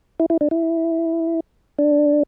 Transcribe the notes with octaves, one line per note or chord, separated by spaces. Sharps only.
E4
E4
D4
E4
D4